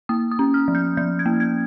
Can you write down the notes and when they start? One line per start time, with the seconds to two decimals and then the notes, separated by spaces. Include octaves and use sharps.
0.09 A#3 D#6
0.31 D#6
0.39 C#4
0.54 F6
0.68 F3
0.75 G6
0.97 F3 G6
1.19 G#6
1.26 A#3
1.40 G#6